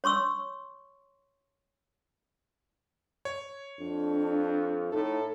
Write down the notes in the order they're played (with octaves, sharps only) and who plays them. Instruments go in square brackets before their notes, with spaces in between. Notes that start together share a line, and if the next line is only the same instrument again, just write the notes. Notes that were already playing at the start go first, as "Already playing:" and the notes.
[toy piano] C#5 C6 C#6 E6
[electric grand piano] C#5
[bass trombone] F2 [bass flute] D4
[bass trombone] A2 [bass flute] D#4 [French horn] A4